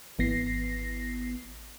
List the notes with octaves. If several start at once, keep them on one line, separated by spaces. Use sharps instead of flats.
G#1 E3 B3 A#6 C7